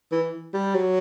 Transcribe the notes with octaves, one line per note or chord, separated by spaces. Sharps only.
E3
G3
F#3